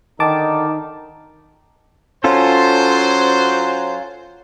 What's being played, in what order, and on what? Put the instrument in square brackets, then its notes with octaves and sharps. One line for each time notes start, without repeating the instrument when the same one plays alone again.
[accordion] D3 D#4 [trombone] D#3 [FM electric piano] A5 D6
[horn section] F#3 C5 [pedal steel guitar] C#4 F4 A4